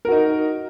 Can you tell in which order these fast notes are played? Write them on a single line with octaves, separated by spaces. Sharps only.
A#4 F#4 D#4